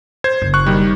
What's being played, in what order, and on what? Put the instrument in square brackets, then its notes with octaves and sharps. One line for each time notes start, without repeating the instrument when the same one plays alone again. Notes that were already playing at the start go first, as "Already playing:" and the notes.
[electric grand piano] C5 G#6
[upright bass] F#1
[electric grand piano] C#6 F#6
D#3 G3